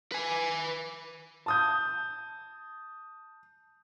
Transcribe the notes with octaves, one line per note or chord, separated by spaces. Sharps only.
B4 G#5
A5 D#6 G6